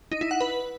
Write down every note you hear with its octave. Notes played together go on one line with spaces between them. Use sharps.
D#4
E4
F#5
B4